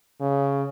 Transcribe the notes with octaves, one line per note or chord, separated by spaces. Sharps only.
C#3